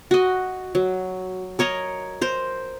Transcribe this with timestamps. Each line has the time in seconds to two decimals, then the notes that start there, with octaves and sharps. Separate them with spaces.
0.11 F#4 D#5
0.75 F#3
1.59 A#4 C#5 D#5 A#5
2.21 A#4 C5